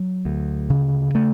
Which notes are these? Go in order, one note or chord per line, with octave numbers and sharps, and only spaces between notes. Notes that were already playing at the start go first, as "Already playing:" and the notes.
Already playing: F#3
D2
C#3
A3